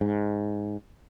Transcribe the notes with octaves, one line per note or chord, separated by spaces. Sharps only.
G#2